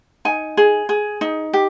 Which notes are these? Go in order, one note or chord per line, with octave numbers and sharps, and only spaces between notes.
D#4 G#5
G#4
G#4
D#4
G4